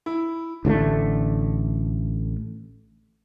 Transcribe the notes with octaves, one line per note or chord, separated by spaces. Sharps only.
E4
A1 D3 F#3 A3